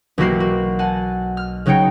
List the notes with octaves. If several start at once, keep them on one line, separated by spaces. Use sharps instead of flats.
B1 E3 A#3 F#4 G4 C7
F#4
F#5 G#5 A5
F6
C#3 F#3 D#4 C#5 G5 C#7